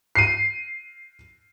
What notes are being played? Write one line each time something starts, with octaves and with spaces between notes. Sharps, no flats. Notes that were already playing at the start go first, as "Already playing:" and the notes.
C7 D#7